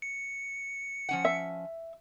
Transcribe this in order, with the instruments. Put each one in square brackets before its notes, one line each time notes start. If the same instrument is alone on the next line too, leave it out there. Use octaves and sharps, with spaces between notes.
[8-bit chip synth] C#7
[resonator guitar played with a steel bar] F3 C#4 F#5
[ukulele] E5